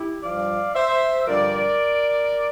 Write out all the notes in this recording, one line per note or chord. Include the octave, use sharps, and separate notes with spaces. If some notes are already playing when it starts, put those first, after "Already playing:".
Already playing: E4 G4
G2 F3 D5 F5
C5 E5
G2 D3 F3 A#4 D5